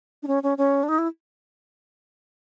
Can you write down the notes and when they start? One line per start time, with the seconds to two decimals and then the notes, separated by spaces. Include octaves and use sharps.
0.23 D4
0.27 C#4
0.43 C#4
0.58 C#4
0.83 D4
0.88 D#4
0.98 E4